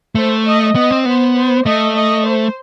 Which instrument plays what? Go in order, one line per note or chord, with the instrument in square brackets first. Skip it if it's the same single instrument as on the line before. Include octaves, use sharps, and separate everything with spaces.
[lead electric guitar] A3 [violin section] C5
[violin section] D#5
[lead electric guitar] B3 [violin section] D#5
[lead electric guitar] C4
[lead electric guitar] B3 [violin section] C5
[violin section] C5
[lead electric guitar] A3 [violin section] D#5
[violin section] D#5
C5